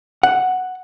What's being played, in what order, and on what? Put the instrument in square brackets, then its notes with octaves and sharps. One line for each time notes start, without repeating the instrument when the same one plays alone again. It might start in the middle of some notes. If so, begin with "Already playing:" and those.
[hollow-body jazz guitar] F#5